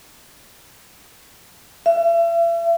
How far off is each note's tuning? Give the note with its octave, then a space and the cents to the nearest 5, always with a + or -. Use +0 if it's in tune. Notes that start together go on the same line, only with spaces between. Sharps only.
E5 +40